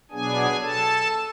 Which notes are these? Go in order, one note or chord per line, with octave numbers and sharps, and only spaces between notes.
B2 F#3 B3 D4 G#4 G#5
A4 A5